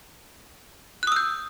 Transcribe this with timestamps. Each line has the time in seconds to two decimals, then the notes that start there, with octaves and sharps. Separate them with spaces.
1.03 F#6
1.07 D#6
1.12 E6
1.16 G6